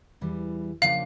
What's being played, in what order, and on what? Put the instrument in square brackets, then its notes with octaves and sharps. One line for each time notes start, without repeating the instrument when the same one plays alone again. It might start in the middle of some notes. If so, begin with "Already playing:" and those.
[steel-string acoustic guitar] E2 E3 G3
[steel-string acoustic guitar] C#3 F3 A#3 D4 [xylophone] F5